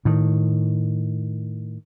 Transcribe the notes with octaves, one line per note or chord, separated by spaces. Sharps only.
A2 D#3